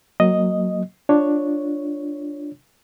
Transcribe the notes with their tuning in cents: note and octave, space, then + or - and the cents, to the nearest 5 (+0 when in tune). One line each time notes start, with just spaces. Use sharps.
F#3 +0 A#3 -10 D#5 +0
D4 +0 F4 +0 C#5 +0